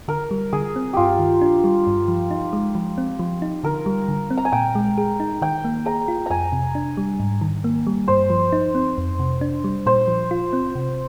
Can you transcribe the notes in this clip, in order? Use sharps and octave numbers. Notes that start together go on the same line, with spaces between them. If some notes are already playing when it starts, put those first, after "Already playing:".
D3 A#4
G3
D3 G#4
C4
G2 F4 G4
D#3
D4
G3
G2
F3
D#4
G#3
F3
C4
F3
D#4
D3 A#4
G3
D3
C4
A#5
G#5
A#2 G5
G#3
G#4
D#4
D#3 G5
A#3
G#4 A#5
F4
F2 G#5 A#5
C3
D4
G3
G#2
D#3
A#3
G3
G2 C5
F3
D#4
C4
F2
C3
D4
G3
A#2 C5
F3
F4
C4
C3